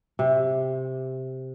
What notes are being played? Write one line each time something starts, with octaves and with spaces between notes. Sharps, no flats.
C3